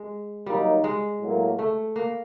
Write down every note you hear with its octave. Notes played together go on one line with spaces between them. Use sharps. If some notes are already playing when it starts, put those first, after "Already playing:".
Already playing: G#3
D#3 F#3 G3 A#3 D#4
G#3
A2 F#3 A#3
A3
A#3